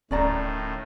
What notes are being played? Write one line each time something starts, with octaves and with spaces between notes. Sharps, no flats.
D1 A2 D#3 C#4 D5 A#5